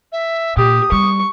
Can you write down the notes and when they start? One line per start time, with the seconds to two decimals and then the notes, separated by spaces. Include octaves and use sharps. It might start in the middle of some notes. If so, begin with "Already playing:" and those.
0.12 E5
0.57 A#2 G4 D#6
0.92 G3 C#6